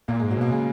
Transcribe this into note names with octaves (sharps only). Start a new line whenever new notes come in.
A#2 A#3
G#2 G#3
F#3
B2 A#3
C#3 G#3